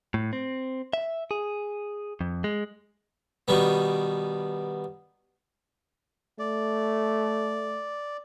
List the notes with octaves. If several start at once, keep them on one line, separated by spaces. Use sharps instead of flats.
A2
C4
E5
G#4
F2
G#3
B2 D#3 G3 B3
A3 D5